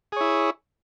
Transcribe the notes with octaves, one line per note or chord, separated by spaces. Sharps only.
E4 G#4 C#5